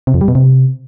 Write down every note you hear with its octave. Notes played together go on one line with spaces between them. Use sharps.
C3
F2
G3
B2
C3